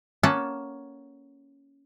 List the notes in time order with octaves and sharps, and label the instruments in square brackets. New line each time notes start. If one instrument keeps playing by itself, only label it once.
[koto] A#3 C#4 A4 F#5 A5